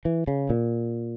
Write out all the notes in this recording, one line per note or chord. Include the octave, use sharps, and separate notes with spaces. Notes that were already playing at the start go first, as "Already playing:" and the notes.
E3
C#3
A#2